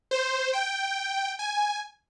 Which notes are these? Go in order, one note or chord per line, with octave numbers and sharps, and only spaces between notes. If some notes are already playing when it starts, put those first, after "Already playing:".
C5
G5
G#5